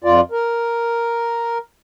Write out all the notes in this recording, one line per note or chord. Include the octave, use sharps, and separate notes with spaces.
F2 F4 D5
A#4